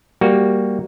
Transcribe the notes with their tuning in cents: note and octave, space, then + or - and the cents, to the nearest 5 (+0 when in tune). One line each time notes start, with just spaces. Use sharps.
G3 +5 A#3 +0 F#4 +0